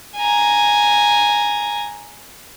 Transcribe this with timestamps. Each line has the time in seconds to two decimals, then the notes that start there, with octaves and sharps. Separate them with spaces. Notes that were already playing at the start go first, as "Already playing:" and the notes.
0.17 G#5 A#5